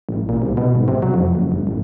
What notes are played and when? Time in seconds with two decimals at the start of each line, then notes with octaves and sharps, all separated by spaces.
0.09 A1
0.29 A#2
0.42 C2
0.57 B2
0.75 G#1
0.88 C3
1.02 F#3
1.14 F2
1.35 F#1
1.52 G1
1.67 A1